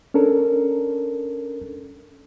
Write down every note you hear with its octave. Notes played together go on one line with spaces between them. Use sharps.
C#4 D4 A4 A#4